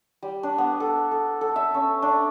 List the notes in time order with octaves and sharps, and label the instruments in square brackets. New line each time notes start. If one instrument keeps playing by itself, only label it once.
[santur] G3
D4
B3
A4
A4
A4
E5
C#4
D4